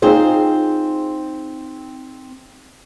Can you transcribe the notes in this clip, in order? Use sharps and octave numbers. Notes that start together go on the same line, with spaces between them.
C4 D#4 F4 G#4 C5